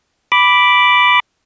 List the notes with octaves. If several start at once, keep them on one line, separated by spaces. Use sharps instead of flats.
B5 D6